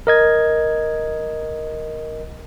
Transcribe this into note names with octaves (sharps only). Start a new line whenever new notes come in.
A#4 D#5 G#6